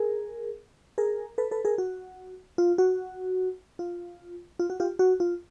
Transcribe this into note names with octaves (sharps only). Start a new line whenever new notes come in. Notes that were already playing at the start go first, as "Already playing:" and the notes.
Already playing: G#4 A#4
G#4 A#4
A4 B4
A4 B4
G#4 A#4
F#4
F4
F#4
F4
F4
F#4
F4 G4
F#4
F4